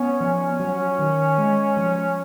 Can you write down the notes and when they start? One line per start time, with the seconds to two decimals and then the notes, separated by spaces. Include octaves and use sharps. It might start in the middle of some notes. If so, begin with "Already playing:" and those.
Already playing: B3 C#4
0.20 F3
0.60 F#3
0.99 D#3
1.38 G#3
1.77 F3